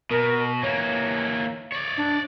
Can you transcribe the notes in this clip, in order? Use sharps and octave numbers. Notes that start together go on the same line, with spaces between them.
B2 A#4
E3 A#3 C#5
C#5 D5
D4